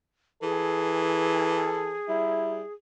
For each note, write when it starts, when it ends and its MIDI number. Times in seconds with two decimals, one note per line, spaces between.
0.43 1.96 52
0.43 2.73 68
0.43 1.98 69
2.08 2.62 55
2.08 2.63 64